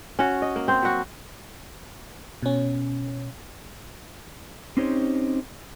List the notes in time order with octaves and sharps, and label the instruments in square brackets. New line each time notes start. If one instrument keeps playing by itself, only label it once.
[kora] C#4 F#4
D#5
A#3
C4 C5
F#3 F#4
[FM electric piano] B2 C#4
[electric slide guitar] C4 C#4 D#4 G4 C5 C#5